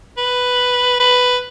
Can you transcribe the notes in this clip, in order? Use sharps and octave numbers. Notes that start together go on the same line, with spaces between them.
B4
B4